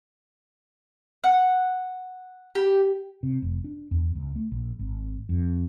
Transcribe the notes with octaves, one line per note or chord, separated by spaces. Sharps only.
F#5
G4
C3
F1
D4
E2
C#2
A3
A#1
G#1
F2